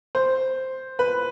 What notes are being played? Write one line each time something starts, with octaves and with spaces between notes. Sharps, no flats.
C5
B4